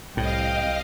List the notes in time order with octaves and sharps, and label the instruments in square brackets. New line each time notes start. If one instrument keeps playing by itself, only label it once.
[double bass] C2 [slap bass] A2 [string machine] D#5 F5 [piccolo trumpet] G5